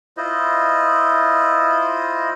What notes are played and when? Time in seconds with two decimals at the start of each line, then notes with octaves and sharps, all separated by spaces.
0.17 E4 F4 C5 D#5